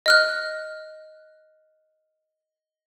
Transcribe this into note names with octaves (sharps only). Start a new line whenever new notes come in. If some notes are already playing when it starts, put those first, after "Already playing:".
D#5 F6 F#6